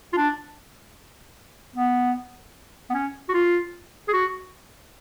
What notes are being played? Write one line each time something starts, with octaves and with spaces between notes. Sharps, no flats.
F4
D4
B3
B3
C#4
F#4
F4
G#4
F#4